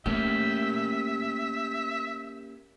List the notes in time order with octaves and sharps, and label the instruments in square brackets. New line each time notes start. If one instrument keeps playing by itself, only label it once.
[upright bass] A3 [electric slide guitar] A#3 C#4 G4 [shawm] E5